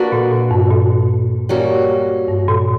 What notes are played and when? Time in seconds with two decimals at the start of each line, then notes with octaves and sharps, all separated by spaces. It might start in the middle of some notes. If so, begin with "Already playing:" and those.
Already playing: A#3 D4 F#4 B4
0.12 A#2
0.31 A#2
0.51 G2
0.70 A#2
1.49 G3 A#3 C#4 F#4
2.28 G2
2.48 A#2